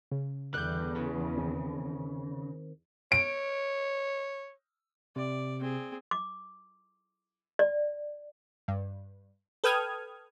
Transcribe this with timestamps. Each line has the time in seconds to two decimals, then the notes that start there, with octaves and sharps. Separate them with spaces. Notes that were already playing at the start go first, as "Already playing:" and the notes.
0.12 C#3
0.54 E2 D3 G3 F#6 G6
0.96 C#3
1.37 D#3 C4
3.12 C#5 D7
5.16 C3 D5
5.60 C4 G#4
6.11 D6
7.59 D5
8.68 G2
9.64 A4 B4 G5 D#6 F6 G#6